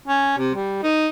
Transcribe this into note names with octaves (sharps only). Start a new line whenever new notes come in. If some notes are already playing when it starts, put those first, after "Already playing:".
C#4
C3
G3
D#4